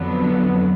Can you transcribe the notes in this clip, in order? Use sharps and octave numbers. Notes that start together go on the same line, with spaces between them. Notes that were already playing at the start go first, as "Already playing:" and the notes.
Already playing: F2 D3 F#3 B3